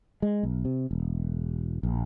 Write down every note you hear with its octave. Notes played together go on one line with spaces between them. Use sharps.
G#3
B1
C3
E1
A#1